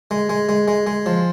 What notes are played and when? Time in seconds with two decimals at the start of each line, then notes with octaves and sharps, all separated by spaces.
0.11 G#3
0.30 G#3
0.49 G#3
0.68 G#3
0.87 G#3
1.06 F3